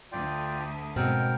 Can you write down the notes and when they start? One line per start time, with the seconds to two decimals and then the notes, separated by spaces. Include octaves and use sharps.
0.12 D2 D3 F4 D5 G5
0.96 G#2 B2 C4 A#4 G5